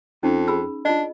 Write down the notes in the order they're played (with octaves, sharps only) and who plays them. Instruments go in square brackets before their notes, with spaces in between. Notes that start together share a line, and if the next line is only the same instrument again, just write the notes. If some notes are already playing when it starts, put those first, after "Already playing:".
[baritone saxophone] F2 [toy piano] C#4 D#4
[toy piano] G#4 B5 E6
[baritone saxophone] D4 [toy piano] F4 D#5